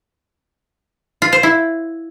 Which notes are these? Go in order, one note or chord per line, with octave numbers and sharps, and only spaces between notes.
F4
C5
E4